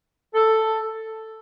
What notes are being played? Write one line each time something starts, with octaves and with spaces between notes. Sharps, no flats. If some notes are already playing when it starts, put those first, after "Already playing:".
A4